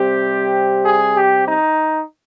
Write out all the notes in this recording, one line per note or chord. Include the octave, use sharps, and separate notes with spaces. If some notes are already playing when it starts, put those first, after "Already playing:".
Already playing: C3 G3 C4 G4
G#4
G4
D#4